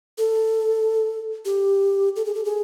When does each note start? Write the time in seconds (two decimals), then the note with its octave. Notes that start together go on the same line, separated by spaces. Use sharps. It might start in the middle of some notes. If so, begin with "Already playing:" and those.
0.18 A4
1.45 G4
2.16 A4
2.26 G#4
2.35 A4
2.45 G#4